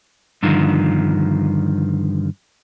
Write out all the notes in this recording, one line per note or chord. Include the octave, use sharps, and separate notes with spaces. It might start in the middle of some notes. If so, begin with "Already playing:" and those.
G2 D3 D#3 F3